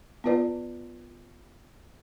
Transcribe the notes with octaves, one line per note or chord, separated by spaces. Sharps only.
B3 F4 B4 D5